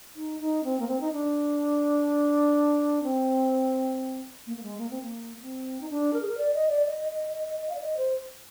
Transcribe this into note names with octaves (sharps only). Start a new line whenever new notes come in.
D#4
D#4
C4
A#3
C4
D#4
D4
C4
A#3
A#3
G#3
A#3
C4
A#3
A#3
C4
D#4
D4
A#4
G#4
A#4
D5
D#5
D5
D#5
D#5
D#5
D#5
D#5
F5
D5
D#5
C5